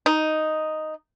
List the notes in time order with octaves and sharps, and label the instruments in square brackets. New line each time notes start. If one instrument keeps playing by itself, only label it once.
[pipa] D#4